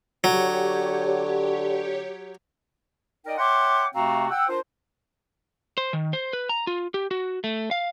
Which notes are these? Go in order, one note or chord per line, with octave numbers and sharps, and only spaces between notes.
D3 F#3 G4 C#5
D#4 A#4 D5 D#5 G5
C#5 E5 F#5 G5 C6 D6
C3 A3 C4 F#4 F5 A#5
F#5 G5 E6
D4 F4 A#4 C5
C5
D#3
C5
B4
A#5
F4
G4
F#4
A3
F5